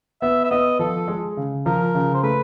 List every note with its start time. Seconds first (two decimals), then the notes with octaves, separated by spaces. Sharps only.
0.22 B3 E5
0.44 E5
0.51 B3 D#5
0.79 F3 A4
1.08 G#3
1.37 C#3
1.66 F3 A#4
1.95 C#3
2.14 C5
2.23 A3 B4